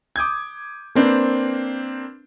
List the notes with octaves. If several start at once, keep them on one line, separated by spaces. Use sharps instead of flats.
D6 D#6 G6 G#6
A#3 C4 D4 B4 C5